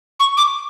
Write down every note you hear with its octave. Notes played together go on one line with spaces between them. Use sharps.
C#6
D6